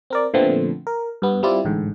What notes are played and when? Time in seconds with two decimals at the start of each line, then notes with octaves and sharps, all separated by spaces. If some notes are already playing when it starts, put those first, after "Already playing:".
0.10 C4 A#4 D5
0.34 A#2 D3 F3 A3 B3 C4
0.87 A#4
1.22 G2 B3
1.43 G3 C4 E4 F4 D5
1.65 A1 G#2 D3